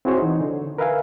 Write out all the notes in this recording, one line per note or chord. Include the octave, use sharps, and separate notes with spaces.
C4 E4 F#4 G#4 C5 C#5
E3 D#4
D3
A#4 B4 E5 F5 G#5